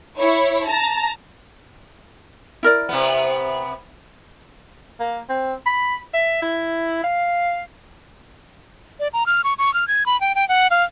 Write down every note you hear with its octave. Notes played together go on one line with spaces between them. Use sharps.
E4 C#5
A5 A#5
E4 A#4 D5
C3 B3
A#3
C4
B5
E5
E4
F5
D5
A#5
F6
C#6
C#6
F6
G#6
B5
G5
G5
F#5
F5